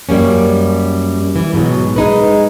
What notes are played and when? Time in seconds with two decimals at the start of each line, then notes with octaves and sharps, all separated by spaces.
0.09 F#2 G3 A#3 C#4
1.36 E3
1.53 G#2 B2 F3 F#3
1.96 G#3 D#4 B4